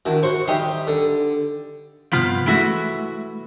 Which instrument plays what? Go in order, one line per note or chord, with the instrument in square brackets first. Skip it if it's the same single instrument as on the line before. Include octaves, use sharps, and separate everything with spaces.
[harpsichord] D#3 [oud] D4 E4 F#4
[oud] F#4 C5 [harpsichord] C#6
[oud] D#3 G3 E5 [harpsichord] G4 D#5 C6
[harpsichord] D3
[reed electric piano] G2 C3 G6 [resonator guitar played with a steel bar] F3 B3 F4
[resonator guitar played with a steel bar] E3 E4 F#4 [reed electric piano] G#3 A3